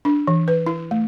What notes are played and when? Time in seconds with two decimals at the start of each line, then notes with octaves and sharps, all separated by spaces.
0.05 D4
0.27 E3
0.48 B4
0.67 E4
0.91 A3